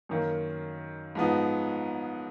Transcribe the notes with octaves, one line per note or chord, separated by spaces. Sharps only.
F#2 D#3 A#3
G#2 F3 B3 D#4